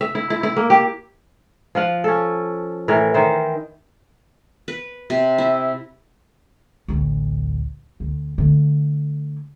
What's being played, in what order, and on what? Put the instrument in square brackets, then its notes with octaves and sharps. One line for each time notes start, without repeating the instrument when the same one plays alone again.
[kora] E5
E4
E4
E4
A#3
G4
F3 F4 F#5
C#4 A4
A2 E3 A#4
D#3 E3 C5
[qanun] B4
C3
E4
[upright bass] A1 D2
D2
D3 A3